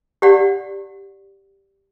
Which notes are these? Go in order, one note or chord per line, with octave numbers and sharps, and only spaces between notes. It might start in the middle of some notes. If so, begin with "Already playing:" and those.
G4 D5 F#5